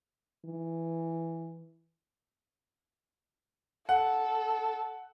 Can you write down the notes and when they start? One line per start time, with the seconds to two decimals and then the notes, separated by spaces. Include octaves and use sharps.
0.45 E3
3.89 A4 F#5